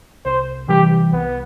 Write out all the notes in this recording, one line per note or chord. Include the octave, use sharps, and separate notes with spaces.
C2 C5
C3 E3 G3 G4
C2 B3